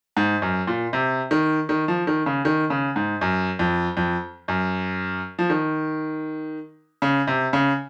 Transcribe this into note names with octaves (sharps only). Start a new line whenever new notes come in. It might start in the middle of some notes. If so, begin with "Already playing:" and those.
G#2
F#2
A#2
C3
D#3
D#3
F3
D#3
C#3
D#3
C#3
G#2
F#2
F2
F2
F#2
F3
D#3
C#3
C3
C#3